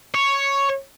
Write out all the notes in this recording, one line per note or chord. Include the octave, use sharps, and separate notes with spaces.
C#5